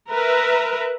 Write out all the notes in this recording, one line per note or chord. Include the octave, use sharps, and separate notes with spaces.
A#4 B4 E5 A#5